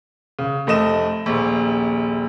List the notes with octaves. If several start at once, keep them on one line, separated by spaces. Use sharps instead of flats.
C#3
F1 A3 D#5 E7
D#1 A#1